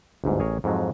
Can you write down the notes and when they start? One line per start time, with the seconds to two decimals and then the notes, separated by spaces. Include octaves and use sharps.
0.24 G1 D2 G#2
0.39 A1 G#4 A#4 C#5
0.64 F2 G#2 F3 F#3